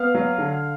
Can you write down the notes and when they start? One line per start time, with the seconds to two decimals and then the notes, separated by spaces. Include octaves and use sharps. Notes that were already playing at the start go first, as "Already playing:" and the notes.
Already playing: B3 F5
0.15 F#3
0.38 D3